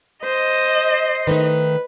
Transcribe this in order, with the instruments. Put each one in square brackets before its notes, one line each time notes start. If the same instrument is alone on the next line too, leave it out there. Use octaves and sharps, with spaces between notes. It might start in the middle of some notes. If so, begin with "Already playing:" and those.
[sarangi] C5 [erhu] D#5
[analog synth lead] C7
[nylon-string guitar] D#3 A3 D#4 [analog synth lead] B4